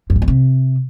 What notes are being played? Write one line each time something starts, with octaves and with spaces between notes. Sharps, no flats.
F#2
G#2
E2
C3